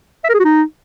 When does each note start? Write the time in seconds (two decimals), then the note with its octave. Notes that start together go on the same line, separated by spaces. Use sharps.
0.24 E5
0.29 A#4
0.34 G#4
0.39 F#4
0.44 D#4